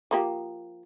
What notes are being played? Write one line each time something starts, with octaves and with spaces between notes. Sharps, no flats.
F3 A#3 G4